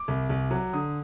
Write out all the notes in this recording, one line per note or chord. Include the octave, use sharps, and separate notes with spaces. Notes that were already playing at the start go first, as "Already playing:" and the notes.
Already playing: D6
C2
C2
F#3
D3 D#6